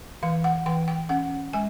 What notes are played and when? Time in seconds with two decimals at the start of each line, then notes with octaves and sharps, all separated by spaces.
0.23 E3 F5
0.44 F#5
0.66 E3 G5
0.88 G5
1.09 C#4 F#5
1.53 G#3 G#5